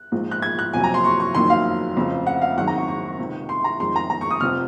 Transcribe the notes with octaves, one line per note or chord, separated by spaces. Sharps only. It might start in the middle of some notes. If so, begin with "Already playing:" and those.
Already playing: F#6
A#1 G#2 F3 G#3
F#6
G#6
F#6
F#1 F2 C3 F#3 G#5
A#5
C6
C#6
C#6
F#1 F2 D#3 F#3 C6
F5
F1 F2 C#3
F#5
F5
G#1 F#2 D#3 G#3 F#5
A#5
C#6
C#6
C#2 C3 D#3
C6
A#5
F1 F2 D#3 G#3 C6
A#5
A#5
C#6
D#6
F1 F2 C3 F3 F6